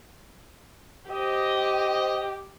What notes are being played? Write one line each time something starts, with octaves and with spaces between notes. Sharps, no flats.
G4 C5 D#5